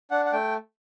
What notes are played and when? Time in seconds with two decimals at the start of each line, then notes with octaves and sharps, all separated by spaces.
0.11 D4 F#5
0.26 F#5
0.33 A3 G5